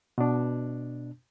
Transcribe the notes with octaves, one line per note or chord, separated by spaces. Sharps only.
B2 D4